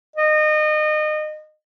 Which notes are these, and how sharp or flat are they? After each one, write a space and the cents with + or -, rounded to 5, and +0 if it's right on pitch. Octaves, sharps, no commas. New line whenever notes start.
D#5 -30